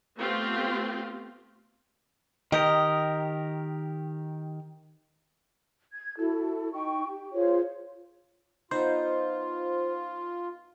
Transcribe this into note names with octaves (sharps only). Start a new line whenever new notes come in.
A3 B3 C4 F4 G4
D#3 G4 A#4 D#5
G#6
E4 F#4 A4
D#4 G5 C#6
G4
F4 G#4 C5 C#5
B3 D#4 F4 C5